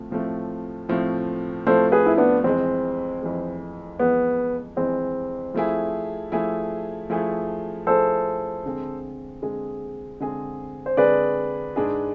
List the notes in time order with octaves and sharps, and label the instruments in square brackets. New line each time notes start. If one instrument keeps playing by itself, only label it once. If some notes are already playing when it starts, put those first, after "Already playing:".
Already playing: [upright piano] A2 F3 A3 C4
A2 F3 A3 C4
A2 F3 A3 C4
[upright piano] A2 F3 A3 C4 [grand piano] A4 C5
[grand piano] G#4 B4
E4
B3 D4
[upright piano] F2 E3 G#3 [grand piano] C4
[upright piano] F2 E3 G#3
[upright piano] F2 E3 G#3 [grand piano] B3
[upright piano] F2 E3 G#3 [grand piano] C4
[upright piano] F3 A3 E4 G#4
F3 A3 E4 G#4
F3 A3 E4 G#4
[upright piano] F3 A3 E4 G#4 [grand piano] A4 C5
[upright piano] D3 G#3 C4 G#4
D3 G#3 C4 G#4
D3 G#3 C4 G#4
[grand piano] C5
[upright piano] D3 G#3 C4 G#4 [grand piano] B4 D5
[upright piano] G#2 G#3 D4 G#4